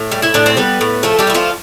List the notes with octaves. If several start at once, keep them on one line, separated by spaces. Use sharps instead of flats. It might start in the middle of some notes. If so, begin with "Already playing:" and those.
Already playing: A2
G3
E4 E5
A2 D4 D5
C4 C5
G3 B3 B4
A2
F3 A3 A4
G3 G4
A3 E4
F3 F4